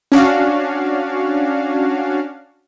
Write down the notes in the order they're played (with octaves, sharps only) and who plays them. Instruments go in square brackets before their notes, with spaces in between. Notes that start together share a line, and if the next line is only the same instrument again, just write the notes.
[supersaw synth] C#4 D4 F#4 F5